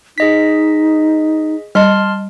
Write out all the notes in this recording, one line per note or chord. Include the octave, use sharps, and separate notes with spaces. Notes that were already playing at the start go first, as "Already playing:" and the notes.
D#4 G#4 D#5 B6
G3 D#5 A5 C6 F6